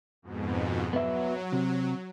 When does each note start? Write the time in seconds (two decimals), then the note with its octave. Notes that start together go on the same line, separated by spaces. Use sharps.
0.22 F2 G#2 B2
0.93 F#3 B3 E5
1.53 C3